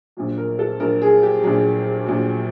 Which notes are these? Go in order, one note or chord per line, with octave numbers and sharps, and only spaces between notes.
A#1 A#2 F#3
A#4
A4
A#1 A#2 F#3 A#4
G#4
G4
A#1 A#2 F#3 G#4
A#1 A#2 F#3